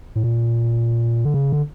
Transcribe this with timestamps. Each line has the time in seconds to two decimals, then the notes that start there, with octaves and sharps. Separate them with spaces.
0.16 A2
0.24 A#2
1.25 D3
1.34 C#3
1.52 D3